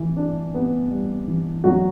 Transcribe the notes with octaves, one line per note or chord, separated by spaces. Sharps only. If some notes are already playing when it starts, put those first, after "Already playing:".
Already playing: E3
D4
B3
G3
E3
F#3 D4 F#4